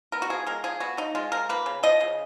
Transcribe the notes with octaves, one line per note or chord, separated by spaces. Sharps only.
B3 A#4
F#4
F3 G#4
G#3 A#4
F3 G#4
B3 F#4
F3 D#4
G#3 F4
F3 A#4
A#3 B4
C#3
F3 D#5
C#3